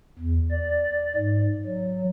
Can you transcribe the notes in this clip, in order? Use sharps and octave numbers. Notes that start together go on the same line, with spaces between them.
E2
D5
G#2
F#3